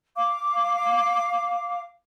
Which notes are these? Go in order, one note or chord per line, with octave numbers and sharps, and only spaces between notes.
F5 D6